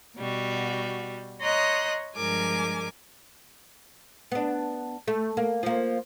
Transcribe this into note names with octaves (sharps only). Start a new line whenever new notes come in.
B2 G3 F#4
C#5 D#5 A#5 C6 D#6 F#6
G2 F3 G#3 A#4 G#5 D6
B3 D4
A3
A#3
F3 A#3